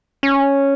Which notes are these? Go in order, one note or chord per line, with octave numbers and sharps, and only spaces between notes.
C#4